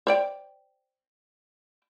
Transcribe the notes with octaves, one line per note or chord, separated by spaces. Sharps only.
C5 D5 G5